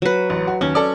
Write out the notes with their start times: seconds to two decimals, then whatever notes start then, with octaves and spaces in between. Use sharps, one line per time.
0.02 F#3 B4
0.30 A1
0.47 F#4
0.61 D#2 C#4
0.75 A4 D5